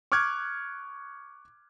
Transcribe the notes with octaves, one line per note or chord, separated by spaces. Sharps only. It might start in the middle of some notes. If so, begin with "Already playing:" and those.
C#6 D6 F6 F#6 G#6